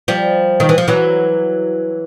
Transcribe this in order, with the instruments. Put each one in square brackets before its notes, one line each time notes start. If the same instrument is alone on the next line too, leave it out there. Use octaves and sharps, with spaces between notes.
[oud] F3 G3
D#3
E3
F3
E3 F#3